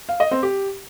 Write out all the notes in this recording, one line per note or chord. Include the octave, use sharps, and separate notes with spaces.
F5
D#5
C4
G4